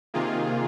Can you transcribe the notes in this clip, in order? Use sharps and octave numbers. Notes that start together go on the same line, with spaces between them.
C3 D#3 A#3 F4 G#4